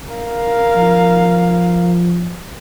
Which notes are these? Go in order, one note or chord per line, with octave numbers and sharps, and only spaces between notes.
A#4 F5
F3